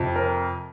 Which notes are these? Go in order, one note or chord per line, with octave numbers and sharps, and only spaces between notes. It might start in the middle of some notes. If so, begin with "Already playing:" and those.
Already playing: F2 C3 F3
A#4